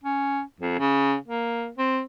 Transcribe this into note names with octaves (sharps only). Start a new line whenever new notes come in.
C#4
F2
C#3
A#3
C4